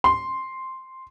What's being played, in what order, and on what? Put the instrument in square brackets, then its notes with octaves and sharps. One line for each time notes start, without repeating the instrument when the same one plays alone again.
[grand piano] C6